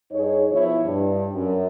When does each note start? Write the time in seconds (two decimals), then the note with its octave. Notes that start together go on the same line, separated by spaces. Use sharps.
0.11 G2 D#4 G#4 C#5
0.51 B2 F3 E4 C#5
0.84 G2
1.34 F#2